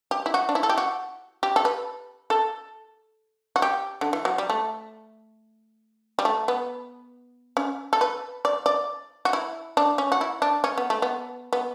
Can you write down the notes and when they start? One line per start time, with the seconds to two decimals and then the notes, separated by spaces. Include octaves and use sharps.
0.11 G4
0.26 E4
0.34 F#4
0.49 D4
0.55 E4
0.63 A4
0.69 G4
0.78 F#4
1.43 G4
1.56 A4
1.65 B4
2.30 A4
3.56 F#4
3.62 G4
4.01 D3
4.13 E3
4.25 F#3
4.38 G3
4.50 A3
6.19 G3
6.25 A3
6.48 B3
7.57 C#4
7.93 A4
8.01 B4
8.45 D5
8.66 D5
9.25 F#4
9.33 E4
9.77 D4
9.98 C#4
10.12 F#4
10.21 E4
10.42 D4
10.64 C#4
10.78 B3
10.90 A3
11.02 B3
11.53 B3